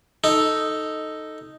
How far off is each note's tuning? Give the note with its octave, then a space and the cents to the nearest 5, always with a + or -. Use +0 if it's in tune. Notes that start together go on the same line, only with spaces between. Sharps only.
D#4 +0 A4 +0